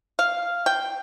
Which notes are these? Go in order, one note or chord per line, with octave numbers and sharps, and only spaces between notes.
F5
G5